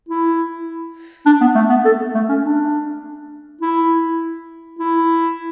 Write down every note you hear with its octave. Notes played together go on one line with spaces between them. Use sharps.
E4
D4
B3
A3
B3
A4
A3
C#4
D4
E4
E4